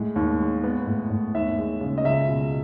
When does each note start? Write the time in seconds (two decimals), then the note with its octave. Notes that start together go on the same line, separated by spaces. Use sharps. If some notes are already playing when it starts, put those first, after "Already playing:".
Already playing: A2 G#3
0.16 D#2
0.40 G#3
0.64 B3
0.87 A2
1.10 A2
1.34 D#2 E5
1.58 G#3
1.81 C#3
1.98 D#5
2.05 C#2 E5
2.29 B2